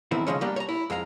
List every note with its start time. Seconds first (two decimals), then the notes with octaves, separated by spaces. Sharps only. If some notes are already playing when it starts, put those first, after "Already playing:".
0.11 E2 D#3 E3 A3 C4 E4
0.27 C#3 F3 G#3 C#4
0.41 G3 A#3 D4 G4
0.56 C#5 A#5
0.69 E4
0.90 F2 G#3 F5 A#5